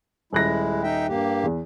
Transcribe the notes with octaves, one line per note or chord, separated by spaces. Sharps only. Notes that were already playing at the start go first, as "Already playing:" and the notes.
D#1 G#3 E4 F#6 A#6
D#4 E5 G5
G2 A#3 G4
E2